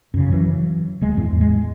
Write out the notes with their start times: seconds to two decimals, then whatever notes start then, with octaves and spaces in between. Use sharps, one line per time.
0.14 F#2 C#3
0.32 E3 F#3
1.01 D1 G#3
1.17 E2 A2
1.41 G#3